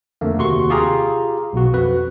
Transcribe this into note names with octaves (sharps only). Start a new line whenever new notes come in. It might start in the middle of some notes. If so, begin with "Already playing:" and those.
F2 D3 A3 A#3
D#2 C3 F#4 C6 C#6
F4 G4 G#4 F5 A#5
B1 B2 F#4
F2 F#4 B4